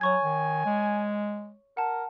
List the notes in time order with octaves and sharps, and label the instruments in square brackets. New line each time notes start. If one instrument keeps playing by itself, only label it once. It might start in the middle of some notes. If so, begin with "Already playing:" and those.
[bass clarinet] F#3 [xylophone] C#5 C#6 G#6 [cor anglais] G#5
[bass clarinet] D#3
G#3
[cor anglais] A#4 [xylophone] F#5 A5